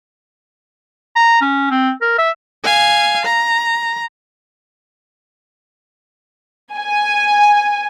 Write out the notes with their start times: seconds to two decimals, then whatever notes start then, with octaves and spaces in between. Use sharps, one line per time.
1.16 A#5
1.41 C#4
1.70 C4
2.01 A#4
2.18 E5
2.64 F5 G#5
3.25 A#5
6.74 G#5